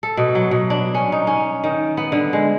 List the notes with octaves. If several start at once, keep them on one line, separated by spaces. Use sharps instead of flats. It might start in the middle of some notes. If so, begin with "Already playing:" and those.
A4
B2
F#3
B2
D4
C#4
D#4
C#4
D#3
B3
D3
G#3